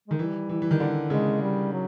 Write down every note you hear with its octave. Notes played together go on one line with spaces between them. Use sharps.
D#3 G#3
E3 G3
E3
E3
D#3
D3
C#3 G#3
G3
F#3